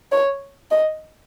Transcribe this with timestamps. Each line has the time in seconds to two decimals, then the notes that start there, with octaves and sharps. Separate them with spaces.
0.12 C#5
0.71 D#5